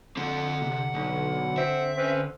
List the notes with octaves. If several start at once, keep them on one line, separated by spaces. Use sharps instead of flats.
D3 C4 A4 F#5
C3
B1
C4 E5
C4 C#4 B4